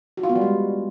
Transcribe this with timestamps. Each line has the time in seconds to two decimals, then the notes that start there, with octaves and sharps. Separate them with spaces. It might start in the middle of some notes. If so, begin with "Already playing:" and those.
0.17 F#4
0.23 F4
0.29 B3
0.35 G3
0.41 G#3